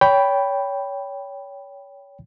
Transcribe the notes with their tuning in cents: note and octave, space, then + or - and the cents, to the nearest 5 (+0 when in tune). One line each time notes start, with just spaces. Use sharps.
C#5 +25 G5 +0 B5 +0